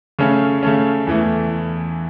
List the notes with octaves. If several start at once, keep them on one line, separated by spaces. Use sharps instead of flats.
C#3 A3 C#4
C#3 A3 C#4
E2 E3 A3